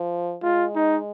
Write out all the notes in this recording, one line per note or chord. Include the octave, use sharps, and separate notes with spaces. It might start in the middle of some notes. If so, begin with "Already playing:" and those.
Already playing: F3
G#3 F4
D#4